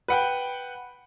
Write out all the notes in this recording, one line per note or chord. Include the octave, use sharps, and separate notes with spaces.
B4 F#5 G5